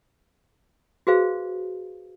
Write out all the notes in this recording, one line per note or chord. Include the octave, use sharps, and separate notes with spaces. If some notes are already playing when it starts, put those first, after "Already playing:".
F#4 G#4 B4 C5 F5